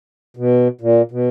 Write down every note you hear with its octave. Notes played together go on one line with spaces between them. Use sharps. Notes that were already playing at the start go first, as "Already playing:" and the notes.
B2
A#2
B2